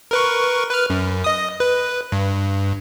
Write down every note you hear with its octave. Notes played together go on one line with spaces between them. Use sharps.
A#4 B4 C#6
B4 F6
F#2
D#5 D#6
B4
G2